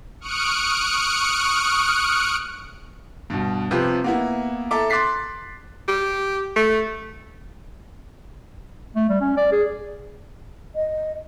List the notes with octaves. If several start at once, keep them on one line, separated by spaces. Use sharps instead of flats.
C#6 D#6 F6 F#6 C#7 D7
G2 B2
C3 F3 F4 G4 B4
A#3 B3 E4
A4 E5 A#5 D6
C6 D6 F#6 A6 B6 C7
G4
A3
A3
G3
C#4
D5
G#4
D#5